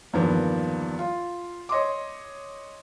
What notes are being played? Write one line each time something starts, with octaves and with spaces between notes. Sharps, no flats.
E2 G2 D#3 F3 A#3 B3
F4
C#5 D#5 C6 D6